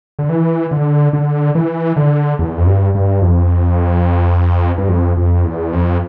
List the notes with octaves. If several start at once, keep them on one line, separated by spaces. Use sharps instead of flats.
D3
E3
D3
D3
E3
D3
E2
F2
G2
G2
F2
G2
F2
F2
E2
F2